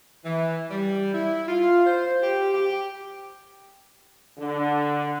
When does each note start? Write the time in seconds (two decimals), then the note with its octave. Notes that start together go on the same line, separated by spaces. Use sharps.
0.24 E3
0.70 G3
1.13 E4
1.48 F4
1.86 C5
2.22 G4
2.54 G4
4.38 D3